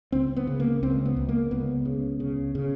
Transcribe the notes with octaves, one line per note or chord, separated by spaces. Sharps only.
C#2 C4
B3
C#3
A#3
C#2 C4
B3
C#2
A#3
C#2 B3
C#3
C#3
C#3